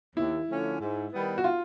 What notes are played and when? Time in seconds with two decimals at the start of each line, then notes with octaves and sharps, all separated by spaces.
0.16 D#2 E4
0.48 D3 F3 A3 C#4
0.80 G#2
1.12 D#3 G3 B3
1.38 F#4
1.44 F4